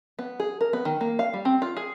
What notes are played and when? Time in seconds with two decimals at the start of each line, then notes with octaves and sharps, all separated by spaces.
0.19 B3
0.40 G#4
0.61 A#4
0.73 B3
0.85 D#3
1.01 A#3
1.19 F5
1.34 G3
1.45 C4
1.62 F4
1.77 G#4